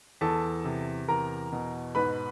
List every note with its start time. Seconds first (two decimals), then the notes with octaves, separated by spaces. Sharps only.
0.21 E2 A4 A5
0.65 C3
1.08 E2 A#4 A#5
1.52 B2
1.95 G#2 B4 B5